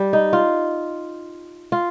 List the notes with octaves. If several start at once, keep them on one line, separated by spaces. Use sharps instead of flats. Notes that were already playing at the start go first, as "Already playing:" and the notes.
Already playing: G3
D#4
F4
F4